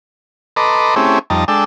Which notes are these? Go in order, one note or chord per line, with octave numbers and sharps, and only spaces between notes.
A4 B4 D#5 A#5 C6 D6
A3 C4 C#4 E4 G4 G#4
F2 G3 D#4 A5 A#5
G#3 D4 A4 G5 E6